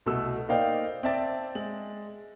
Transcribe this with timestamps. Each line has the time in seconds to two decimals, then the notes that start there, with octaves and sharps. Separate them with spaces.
0.06 C2 B2 A3 E6
0.49 A#3 D#4 C5 D5 F5 G5
1.03 C4 D5 E5 A5 A6
1.55 G#3 F#7